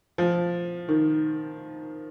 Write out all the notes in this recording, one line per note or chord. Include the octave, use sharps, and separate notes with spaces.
F3
D#3